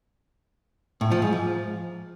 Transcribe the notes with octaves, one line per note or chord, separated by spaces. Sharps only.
A2
F3
G#2
F3